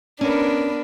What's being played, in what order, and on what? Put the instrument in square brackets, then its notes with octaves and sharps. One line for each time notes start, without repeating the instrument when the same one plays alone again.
[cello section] B3 A#4 B4 [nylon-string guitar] C#4 [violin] D4